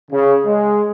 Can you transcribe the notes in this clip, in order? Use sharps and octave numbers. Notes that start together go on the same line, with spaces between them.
C#3
G#3